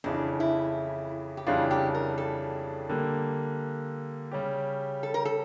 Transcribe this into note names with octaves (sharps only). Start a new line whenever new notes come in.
F2 C#3 E3 D4
E4
G4
F2 C#3 E3 G3 D4 F4
G4
A#4
A4
D3 G3 A#3
C#3 G3 C#4 G4
A4
A#4
A4